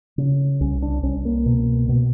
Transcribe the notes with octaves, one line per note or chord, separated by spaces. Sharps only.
C#3
C2 C#4
D4
C2 C#4
A#3
B2
B2